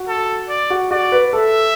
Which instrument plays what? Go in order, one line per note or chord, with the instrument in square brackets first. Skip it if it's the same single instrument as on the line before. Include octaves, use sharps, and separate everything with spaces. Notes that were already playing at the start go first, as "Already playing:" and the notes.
Already playing: [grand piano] F#4
[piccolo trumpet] A4
D5
[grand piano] F#4
[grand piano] F#4 [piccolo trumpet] D5
[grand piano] B4
[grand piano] A4 [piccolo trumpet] E5